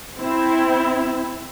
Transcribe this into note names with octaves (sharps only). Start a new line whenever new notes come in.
C4 E4